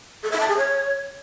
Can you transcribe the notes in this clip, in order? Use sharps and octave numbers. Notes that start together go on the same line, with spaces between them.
A4
E5
A5
G#4
C#5